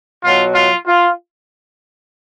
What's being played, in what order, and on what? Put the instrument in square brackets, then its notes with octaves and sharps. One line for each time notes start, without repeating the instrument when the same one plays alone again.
[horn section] B2 F#3 F4
F4
F4